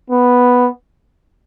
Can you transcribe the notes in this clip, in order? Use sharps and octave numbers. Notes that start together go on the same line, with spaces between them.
B3